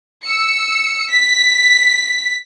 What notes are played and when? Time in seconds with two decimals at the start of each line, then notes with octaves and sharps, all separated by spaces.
0.22 E6 C#7
1.08 B6